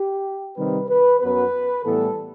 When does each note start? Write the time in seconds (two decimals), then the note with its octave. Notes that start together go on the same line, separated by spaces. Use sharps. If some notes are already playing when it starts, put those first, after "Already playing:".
Already playing: G4
0.56 C3 D#3 G3 C4 B4
0.89 B4
1.20 F#2 F#3 B3 B4
1.85 A2 E3 G3 B3 A4